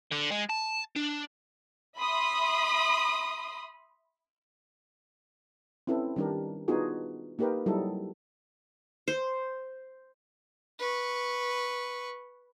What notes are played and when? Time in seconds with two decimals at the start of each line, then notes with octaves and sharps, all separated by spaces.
0.11 D3
0.31 G#3
0.49 A5
0.96 D4
1.99 E5 B5 C6 D#6
5.87 C4 C#4 E4 A4 B4
6.16 D#3 G3 D4 G4 A#4
6.68 B3 D4 D#4 F4 F#4 G#4
7.39 A#3 D#4 G4 A#4 B4
7.66 F#3 G3 D#4 E4 A4
9.08 C5
10.79 B4 C#6